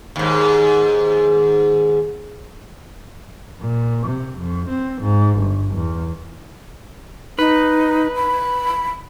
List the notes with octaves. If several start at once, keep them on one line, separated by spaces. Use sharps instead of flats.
D#2 G#2
A#2
C3
F2
C4
G#2
G1
E2
D#4 B4
B5